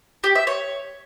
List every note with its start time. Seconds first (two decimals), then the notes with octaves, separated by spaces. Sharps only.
0.24 G4
0.35 E5
0.47 C#5